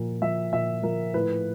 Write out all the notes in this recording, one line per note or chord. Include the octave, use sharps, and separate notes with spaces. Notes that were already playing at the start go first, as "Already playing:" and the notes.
Already playing: A#2 F3 A#3
F3 E5
A#2 E5
F3 A#4
A2 B4